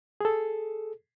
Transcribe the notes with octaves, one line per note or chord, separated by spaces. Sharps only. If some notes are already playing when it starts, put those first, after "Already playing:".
G#4 A4